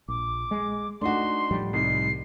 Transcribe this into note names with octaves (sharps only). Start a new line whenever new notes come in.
A#1 D6
G#3
A3 D4 D#4 F#4 C6
A2 F3 G3
C2 D#4 C7